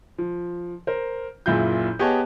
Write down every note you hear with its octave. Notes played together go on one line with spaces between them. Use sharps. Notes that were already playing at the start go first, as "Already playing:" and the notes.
F3
A#4 C5
F#1 A#2 E4 F4 G6
B3 G4 G#4 C#5 D#5 A5